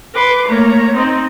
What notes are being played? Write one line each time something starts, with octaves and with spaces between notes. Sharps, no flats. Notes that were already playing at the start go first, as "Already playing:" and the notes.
B4 C6 D6
A3 A#3 C#5 A#5
C4 D#4 D#5